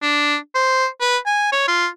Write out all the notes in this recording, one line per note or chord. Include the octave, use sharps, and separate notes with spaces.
D4
C5
B4
G#5
C#5
F4